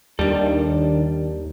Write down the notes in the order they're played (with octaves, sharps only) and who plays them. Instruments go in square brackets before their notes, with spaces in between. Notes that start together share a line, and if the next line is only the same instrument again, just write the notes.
[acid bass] D#2 [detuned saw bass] D#3 [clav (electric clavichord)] G3 [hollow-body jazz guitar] D4 A4